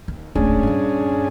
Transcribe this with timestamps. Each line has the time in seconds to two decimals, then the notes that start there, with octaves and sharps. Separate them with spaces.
0.08 D#2
0.35 D1 G#1 C#4 D4 G#4
0.63 G2 A#2